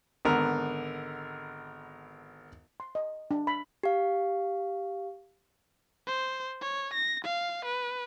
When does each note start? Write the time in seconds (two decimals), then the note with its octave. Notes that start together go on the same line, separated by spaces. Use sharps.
0.25 G#1 D3 B3 A#4
2.80 C6
2.95 D#5
3.31 D4
3.47 B5
3.83 G4 F5
6.07 C5
6.61 C#5
6.93 A#6
7.24 F5
7.65 B4